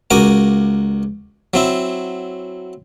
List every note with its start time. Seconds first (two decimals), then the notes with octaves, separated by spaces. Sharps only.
0.10 C#2 F#4 A#4 G#5 D6
1.54 F#3 C4 E4